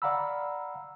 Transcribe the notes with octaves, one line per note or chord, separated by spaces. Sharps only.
D5 F5 F#5 A#5 B5 E6